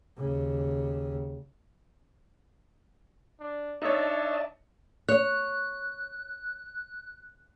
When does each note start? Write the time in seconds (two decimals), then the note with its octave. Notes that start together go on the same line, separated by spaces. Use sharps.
0.17 D#2 C#3
3.40 D4
3.82 D4 D#4 C#5 D#5 E5 A5
5.09 C#5 F#6